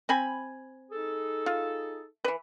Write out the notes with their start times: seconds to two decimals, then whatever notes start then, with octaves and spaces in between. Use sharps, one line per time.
0.09 C4 G#5 B5
0.91 D#4 G#4 A4
1.46 F4
2.24 E3 B4